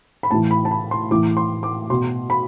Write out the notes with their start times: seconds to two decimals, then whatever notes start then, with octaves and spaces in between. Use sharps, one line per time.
0.23 B5
0.31 A2 E3 A5
0.51 B5
0.65 A5
0.71 B5
0.91 C6
1.11 A2 E3 D6
1.37 C6
1.63 D6
1.90 B2 C6
2.30 B5